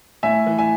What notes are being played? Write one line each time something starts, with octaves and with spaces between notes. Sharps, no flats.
A2 E5 G#5
E3
E5 G#5